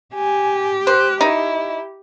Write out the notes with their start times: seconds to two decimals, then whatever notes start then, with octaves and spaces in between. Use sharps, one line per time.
0.14 G4 G#5
0.87 C5 F#6
1.21 D#4 E4